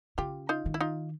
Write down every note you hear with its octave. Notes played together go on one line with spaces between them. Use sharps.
C#3 F4 G4
D#4 F4
D#3
E4
D#4 F4